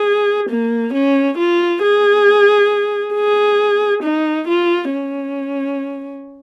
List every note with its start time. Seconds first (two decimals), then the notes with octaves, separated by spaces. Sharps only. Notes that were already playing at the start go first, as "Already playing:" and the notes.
Already playing: G#4
0.50 A#3
0.93 C#4
1.38 F4
1.82 G#4
3.14 G#4
4.03 D#4
4.48 F4
4.92 C#4